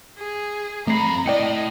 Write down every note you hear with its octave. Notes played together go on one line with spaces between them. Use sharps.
G#4
F2 A3 A#5 B5 C7
A2 D5 D#5 G5 C#7